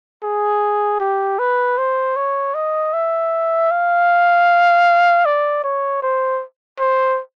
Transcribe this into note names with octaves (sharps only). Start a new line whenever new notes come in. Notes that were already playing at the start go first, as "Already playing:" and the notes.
G#4
G4
B4
C5
C#5
D#5
E5
F5
D5
C#5
C5
C5